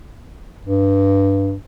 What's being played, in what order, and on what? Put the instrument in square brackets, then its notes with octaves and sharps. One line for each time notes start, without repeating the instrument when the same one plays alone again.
[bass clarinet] G2